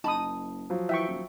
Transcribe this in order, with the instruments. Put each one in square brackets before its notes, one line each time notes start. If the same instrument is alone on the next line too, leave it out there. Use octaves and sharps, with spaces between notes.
[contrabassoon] F#1 [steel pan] D#4 D#6 [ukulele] A5 B5
[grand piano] F3 F#3
[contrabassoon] E3 [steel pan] E5 G5 C#6
[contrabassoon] D#1